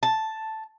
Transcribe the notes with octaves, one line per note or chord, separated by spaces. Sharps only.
A5